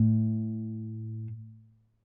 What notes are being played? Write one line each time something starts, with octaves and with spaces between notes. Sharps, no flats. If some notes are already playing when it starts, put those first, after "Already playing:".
Already playing: A2